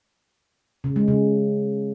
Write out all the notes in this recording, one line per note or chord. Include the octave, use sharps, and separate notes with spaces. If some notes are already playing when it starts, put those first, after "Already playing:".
C#3
G#3
C#3